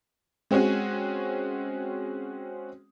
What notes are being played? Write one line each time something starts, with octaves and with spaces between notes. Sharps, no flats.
G#3 C4 C#4 F#4 G#4